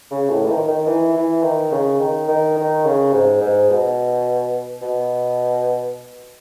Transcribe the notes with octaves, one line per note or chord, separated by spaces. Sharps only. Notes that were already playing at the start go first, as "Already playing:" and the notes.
C#3
A2
E3
D#3
D#3
E3
E3
D#3
C#3
D#3
D#3
D#3
C#3
G#2
G#2
B2
B2